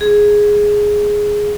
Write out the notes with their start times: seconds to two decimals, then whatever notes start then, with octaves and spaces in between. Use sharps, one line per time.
0.01 G#4